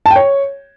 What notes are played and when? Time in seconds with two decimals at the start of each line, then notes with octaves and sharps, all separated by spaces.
0.06 A5
0.11 G5
0.16 C#5